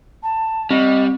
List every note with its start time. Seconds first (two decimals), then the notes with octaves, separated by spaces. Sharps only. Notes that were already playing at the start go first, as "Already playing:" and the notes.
0.23 A5
0.71 G3 C4 D#5